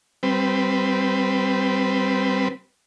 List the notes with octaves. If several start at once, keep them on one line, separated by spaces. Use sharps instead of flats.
G3 C4 B4